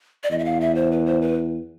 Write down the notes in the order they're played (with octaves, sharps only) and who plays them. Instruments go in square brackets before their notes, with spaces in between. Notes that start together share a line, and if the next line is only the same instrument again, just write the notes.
[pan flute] D5
[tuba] E2 [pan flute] D#5
[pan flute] E5
F5
E5
C5
B4
C5
B4